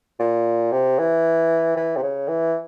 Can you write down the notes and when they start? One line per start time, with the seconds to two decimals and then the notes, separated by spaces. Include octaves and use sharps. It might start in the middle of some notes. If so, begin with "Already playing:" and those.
0.19 A#2
0.72 C3
0.99 E3
1.77 E3
1.96 C3
2.02 C#3
2.28 E3